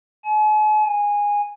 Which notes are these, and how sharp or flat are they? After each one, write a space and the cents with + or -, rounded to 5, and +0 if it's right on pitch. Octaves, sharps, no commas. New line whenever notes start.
G#5 +45
G#5 -15